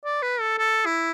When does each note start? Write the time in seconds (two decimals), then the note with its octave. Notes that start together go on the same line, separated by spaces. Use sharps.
0.05 D5
0.23 B4
0.40 A4
0.58 A4
0.86 E4